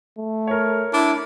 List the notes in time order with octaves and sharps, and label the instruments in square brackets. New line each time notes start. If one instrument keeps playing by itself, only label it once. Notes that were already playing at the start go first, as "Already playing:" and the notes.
[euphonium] A3
[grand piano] A#4 C#5
[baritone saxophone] D4 [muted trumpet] E4